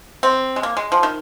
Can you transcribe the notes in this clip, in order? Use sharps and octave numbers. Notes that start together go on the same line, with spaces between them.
C4
G#3
A#3
G#3
F3
D#3